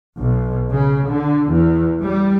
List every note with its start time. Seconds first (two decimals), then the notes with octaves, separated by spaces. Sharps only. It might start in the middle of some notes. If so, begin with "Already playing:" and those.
0.19 B1
0.71 C#3
1.08 D3
1.51 E2
2.02 G3